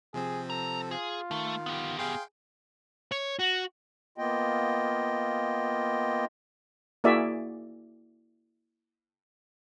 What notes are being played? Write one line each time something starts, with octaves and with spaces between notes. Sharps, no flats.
C3 F3 C4 G#4
A4 A#5
F4 G#4
D#3 A3
B3 G4
G#4 F5 G5 C6
C#5
F#4
A#3 B3 F4 D#5 G5
A#3 E4 F#4 G#4 D5 E5